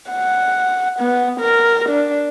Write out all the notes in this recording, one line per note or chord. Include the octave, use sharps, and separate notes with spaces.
F#5
B3
A#4
D4